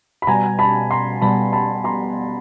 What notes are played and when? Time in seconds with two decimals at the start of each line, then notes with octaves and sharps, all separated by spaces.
0.22 B5
0.27 B2 G3 B3 G#5 A#5
0.59 A5 B5
0.91 A#5 C6
1.22 B2 G3 B3 A5 B5
1.53 A5 B5
1.84 A#5 C6